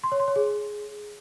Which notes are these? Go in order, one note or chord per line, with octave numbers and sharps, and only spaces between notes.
C6
C#5
C6
C#5
G#4